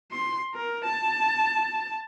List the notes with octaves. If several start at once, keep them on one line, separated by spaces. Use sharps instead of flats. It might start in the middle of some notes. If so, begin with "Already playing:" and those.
C6
A#4
A5